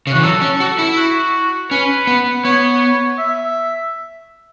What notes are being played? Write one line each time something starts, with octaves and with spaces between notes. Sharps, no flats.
C#3
E3 F#4
F#3 A4
C#4
F#4
E4
F#4
C#4 B4
B3
B3 C#5
E5